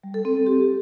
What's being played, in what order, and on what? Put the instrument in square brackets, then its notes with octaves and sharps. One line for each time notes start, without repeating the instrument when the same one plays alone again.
[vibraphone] G3
A4
C4
A4
G4